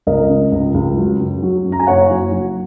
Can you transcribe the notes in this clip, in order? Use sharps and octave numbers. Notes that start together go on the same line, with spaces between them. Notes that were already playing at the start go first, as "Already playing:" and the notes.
C#2 A#4 D#5
C#3
C#2
C#2
F#3
F#2
F#3
F#2
A#5
G#5
F#1 C#5 F#5
F#3
F#3